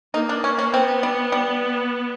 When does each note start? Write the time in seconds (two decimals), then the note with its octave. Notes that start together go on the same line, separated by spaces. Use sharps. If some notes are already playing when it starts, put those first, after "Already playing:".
0.14 A#3 D#4
0.29 D4
0.44 C#4
0.59 C#4
0.73 B3 C4
1.03 G3
1.32 G3